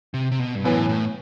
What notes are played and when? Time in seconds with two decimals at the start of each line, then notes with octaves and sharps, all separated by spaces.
0.14 C3
0.32 C3
0.39 B2
0.55 G2
0.64 F#2 A2 E3 B3
0.89 A2